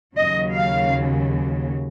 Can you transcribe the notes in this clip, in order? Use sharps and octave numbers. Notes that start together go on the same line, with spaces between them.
D#2 C#3 F#3 D#5
F5